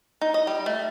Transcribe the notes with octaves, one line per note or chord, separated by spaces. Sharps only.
D#4
D#5
G3
A3